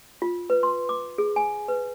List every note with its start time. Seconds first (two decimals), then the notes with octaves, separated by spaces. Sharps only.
0.22 F4
0.50 B4
0.63 C6
0.89 D6
1.18 G#4
1.36 G#5
1.68 B4